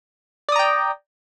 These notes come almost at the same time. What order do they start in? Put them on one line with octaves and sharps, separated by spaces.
D5 D#6 A#5 G5